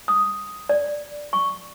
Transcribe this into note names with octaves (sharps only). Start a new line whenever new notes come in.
D#6
D5
C#6